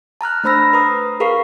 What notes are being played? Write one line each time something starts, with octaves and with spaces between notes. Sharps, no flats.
A5 A#5 F6 F#6
A3 D4 C5 B5 E6 A#6
B4 A#5 D#6
G#4 A#4 B4 F5 C#6 C7